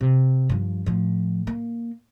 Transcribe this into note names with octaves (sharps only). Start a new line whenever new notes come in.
C3
G2 F3
A2 F3
A#3